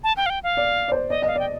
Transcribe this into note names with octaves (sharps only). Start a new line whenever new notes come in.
A5
G5
F5
G5
F5
D5
D5
C5
D5 D#5
D#5 F5
D5
G5